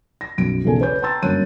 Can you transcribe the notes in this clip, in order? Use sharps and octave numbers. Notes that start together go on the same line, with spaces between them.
A#6
B1 F#2 D7
B1 E2 C#3 A4 G#5
B4 C#5 D5 G6
G5 A5 A#5 C6 E6 A6
G1 F#2 A#3 C#5 F#6 D#7